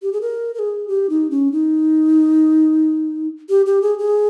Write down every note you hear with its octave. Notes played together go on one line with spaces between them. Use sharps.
G4
G#4
A#4
A#4
G#4
G4
D#4
C#4
D#4
G4
G4
G#4
G#4